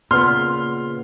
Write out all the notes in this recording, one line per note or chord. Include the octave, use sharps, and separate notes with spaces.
A#2 C#3 B3 C6 F6